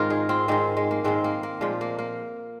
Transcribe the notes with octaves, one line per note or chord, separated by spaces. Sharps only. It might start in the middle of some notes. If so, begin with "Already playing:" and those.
Already playing: G#2 D#3 C4 F4 A#4 C5
D#4 G#4
C4 F4
G#2 D#3 G#3 C4
G#3
A#3
G#2 D#3 G#3 C4
A#3
A#3
A#2 F3 G#3
A#3
A#3